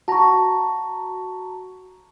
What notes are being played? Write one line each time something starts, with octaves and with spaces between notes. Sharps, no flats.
F#4 A5 A#5 C#6